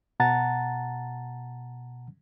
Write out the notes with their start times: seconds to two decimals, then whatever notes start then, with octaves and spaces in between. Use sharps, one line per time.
0.20 B2 F#5 A5 A#5 A6